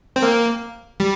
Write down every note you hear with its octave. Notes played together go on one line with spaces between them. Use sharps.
C4
A#3
G3